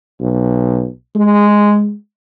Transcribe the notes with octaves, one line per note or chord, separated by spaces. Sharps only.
B1
G#3